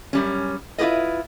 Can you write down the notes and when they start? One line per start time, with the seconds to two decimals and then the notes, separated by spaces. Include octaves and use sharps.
0.13 F#2 G3 C#4
0.78 E4 F4 G4 G#4 B4 D#5